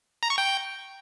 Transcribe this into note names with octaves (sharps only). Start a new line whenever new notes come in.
A#5
C#6
G5